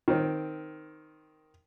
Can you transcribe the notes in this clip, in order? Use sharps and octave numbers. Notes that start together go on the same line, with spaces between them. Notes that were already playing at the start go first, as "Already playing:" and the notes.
D#3 C4